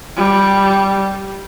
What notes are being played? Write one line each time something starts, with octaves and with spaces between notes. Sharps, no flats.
G3